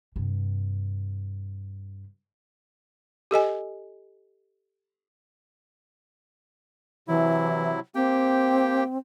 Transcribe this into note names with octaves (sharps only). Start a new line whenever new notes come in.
G2 C3
G4 A4 D#5 G#5
C3 E3 F#3 E4
A#3 C4 G4 G5